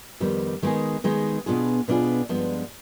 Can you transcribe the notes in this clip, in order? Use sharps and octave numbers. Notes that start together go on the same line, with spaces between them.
F2 D#3 G3 B3 D#4
D#3 G#3 B3 D#4 G#4
D#3 G#3 B3 D#4 G#4
B2 B3 D4 F4 G#4
B2 B3 D4 F4 G#4
G2 F3 G#3 B3 D4